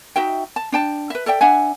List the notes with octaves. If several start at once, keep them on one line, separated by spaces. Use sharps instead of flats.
D#4 F#4 E5 G5
A5
D4 G5 A5
B4 E5
A4 D5 E5 G5
D4 E5 F#5 G#5